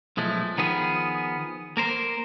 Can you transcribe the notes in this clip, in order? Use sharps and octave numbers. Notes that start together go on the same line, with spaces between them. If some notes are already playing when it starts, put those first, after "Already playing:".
B1 F3 G#3 A3
D#3 F3 B3 G#4
A#3 A#4 C5